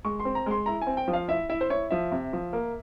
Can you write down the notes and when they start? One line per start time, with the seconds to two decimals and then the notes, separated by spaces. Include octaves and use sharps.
0.04 G#3 C#6
0.20 C6
0.25 C4
0.35 A#5
0.46 G#3 C6
0.66 E4 A#5
0.82 G#5
0.87 C4
0.97 G5
1.08 F3
1.13 F5
1.28 E4 E5
1.49 E4 E5
1.61 C5
1.70 E4 C#5
1.90 F3 E5
2.12 C3
2.33 F3
2.53 A#3